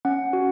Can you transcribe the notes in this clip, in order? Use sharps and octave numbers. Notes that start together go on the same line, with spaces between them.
C#4 F#5
F#4